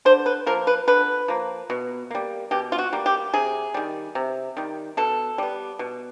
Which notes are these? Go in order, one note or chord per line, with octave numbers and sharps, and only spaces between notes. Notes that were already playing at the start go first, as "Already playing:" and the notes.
D3 C5
B4
F3 A#3 A#4
B4
D3 B4
F3 A#3
B2
G3 A#3
B2 G4
F4
F#4
G3 A#3
G4
C3 G#4
D#3 G3
C3
D#3 G3
B2 A4
G3 B3
B2